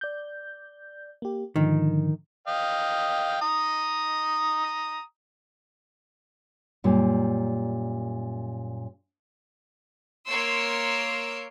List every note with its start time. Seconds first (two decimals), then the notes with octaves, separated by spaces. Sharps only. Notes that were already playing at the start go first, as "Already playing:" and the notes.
0.01 D5 G6
1.22 A#3 G4
1.56 G#2 D3 D#3 F3
2.47 D#5 F5 G5
3.41 A#5 D#6
6.84 F#2 A#2 G3
10.27 A#3 C#5 C6 E6 C7 D7